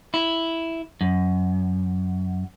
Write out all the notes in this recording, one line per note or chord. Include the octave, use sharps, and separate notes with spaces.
E4
F#2